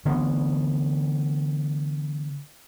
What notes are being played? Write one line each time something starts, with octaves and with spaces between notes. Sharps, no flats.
D3 E3 A3 B3